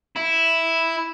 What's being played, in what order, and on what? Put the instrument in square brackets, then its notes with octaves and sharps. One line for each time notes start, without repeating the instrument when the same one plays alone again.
[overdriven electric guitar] E4